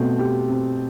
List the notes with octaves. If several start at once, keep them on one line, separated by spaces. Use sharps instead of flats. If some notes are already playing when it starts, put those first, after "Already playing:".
Already playing: B2 A3 C4
G4
C4